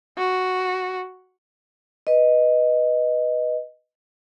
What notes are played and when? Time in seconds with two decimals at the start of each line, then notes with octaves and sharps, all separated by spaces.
0.18 F#4
2.07 B4 D#5